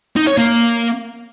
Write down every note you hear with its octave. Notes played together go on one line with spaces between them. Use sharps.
D#4
C#5
A#3